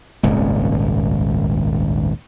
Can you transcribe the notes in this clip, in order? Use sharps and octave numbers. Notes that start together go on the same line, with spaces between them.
D#1 G#1 C#2